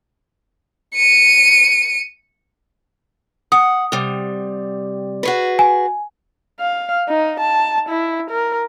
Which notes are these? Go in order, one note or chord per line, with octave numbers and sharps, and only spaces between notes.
C#7 D#7
F#5 D#6
C3 G3
F#4 G#4 B4
G#5
F5
D#4
A5
E4
A#4